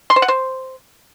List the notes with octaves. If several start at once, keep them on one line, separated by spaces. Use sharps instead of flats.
C6
C5
F#5
C5